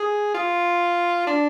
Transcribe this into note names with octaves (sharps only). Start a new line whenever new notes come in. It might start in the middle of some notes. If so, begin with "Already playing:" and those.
Already playing: G#4
F4
D4